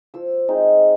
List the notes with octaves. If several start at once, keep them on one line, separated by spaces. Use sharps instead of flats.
F3 E6
G#3 C4 D#4